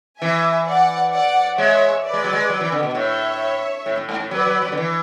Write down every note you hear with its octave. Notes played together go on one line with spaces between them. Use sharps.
E3 E5 G#5
D5 F#5
D5 F#5
G#3 C#5 E5
B4 D5
G#3
F#3
G#3
F#3
E3
D3
B2
A2 C#5 E5
A2
A2
G#2
A2
F#3 B4 D5
F#3
F#3
D3
E3